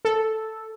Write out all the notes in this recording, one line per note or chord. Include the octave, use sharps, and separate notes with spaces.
A4